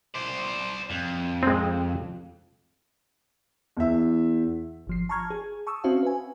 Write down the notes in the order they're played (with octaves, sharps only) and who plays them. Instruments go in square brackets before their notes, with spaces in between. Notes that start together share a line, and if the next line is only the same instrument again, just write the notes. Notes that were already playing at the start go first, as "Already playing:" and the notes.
[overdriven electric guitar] C5 D5
F2
[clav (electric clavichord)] G#3 C4
[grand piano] E2 E3 E5
[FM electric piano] G1 F3 C7
A5 A#5 C#6 F6 G#6
G#4
A5 C#6 D#6 E6
C4 C#4 F#4 C5 E5 F5
B4 G#5